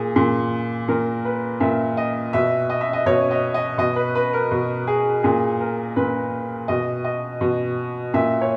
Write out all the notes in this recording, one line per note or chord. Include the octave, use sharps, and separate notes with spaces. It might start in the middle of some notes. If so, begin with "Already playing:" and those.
Already playing: A#2 G#4
A#2
A#2 A#4
B4
A#2 E5
D#5
B2 E5
D#5
E5
D#5
B2 C#5
D#5
D#5
B2 D#5
B4
B4
A#4
B2
G#4
A#2 G#4
A#4
A#2 B4
B2 D#5
D#5
B2
A#2 E5
C#5